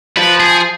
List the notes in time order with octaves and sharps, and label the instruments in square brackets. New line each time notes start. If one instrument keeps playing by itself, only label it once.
[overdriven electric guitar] F3 [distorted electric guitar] B4
[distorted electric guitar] G#4